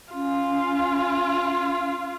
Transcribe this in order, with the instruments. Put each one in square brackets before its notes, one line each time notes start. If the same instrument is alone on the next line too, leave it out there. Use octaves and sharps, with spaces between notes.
[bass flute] C#4 [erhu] F4